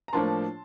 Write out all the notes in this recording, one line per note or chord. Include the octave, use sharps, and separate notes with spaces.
A#5
A2 F3 A#3 D4 A5 C6